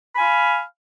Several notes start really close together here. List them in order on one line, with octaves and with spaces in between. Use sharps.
B5 G#5 F5